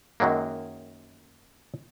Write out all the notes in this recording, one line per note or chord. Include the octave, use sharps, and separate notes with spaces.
F#2 D#3 F#3 G#3 A#3